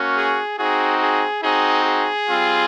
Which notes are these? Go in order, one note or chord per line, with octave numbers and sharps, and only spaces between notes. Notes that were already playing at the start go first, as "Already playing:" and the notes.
Already playing: A#3 C#4 F#4
G#4
C4 D#4 F#4 G#4
G#4
C4 D#4 F#4 G#4
G#4
G3 C4 F4